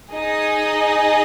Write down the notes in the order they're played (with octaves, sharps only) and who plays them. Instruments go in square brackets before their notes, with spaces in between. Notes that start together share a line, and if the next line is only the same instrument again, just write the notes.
[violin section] D#4 G#4 D#5